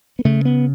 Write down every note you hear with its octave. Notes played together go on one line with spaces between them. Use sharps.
B3
C#3 A3
B3